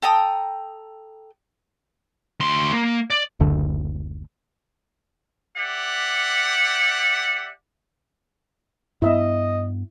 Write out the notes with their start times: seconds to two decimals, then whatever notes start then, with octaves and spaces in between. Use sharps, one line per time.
0.02 A4 G5 A#5 D#6
2.40 D2 C6
2.73 A#3
3.10 D5
3.40 F#1 D2 D3
5.57 G4 D5 E5 F#5
9.02 G2 B3 E4 D#5 E5